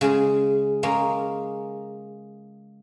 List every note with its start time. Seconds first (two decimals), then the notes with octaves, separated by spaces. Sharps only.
0.01 C#3 G#3 G#4
0.83 G#3 A#3 C#4